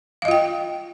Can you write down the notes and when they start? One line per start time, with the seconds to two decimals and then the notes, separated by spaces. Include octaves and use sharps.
0.22 F5
0.25 D#5
0.28 F4
0.31 G5